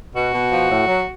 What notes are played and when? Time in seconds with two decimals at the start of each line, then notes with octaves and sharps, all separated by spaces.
0.14 B2 F#4
0.33 B2
0.51 F3
0.70 A2
0.87 F#3